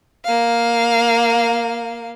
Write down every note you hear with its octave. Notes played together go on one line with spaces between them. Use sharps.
A#3 F5